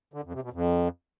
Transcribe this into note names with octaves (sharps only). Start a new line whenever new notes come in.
D3
F2
C3
B2
F2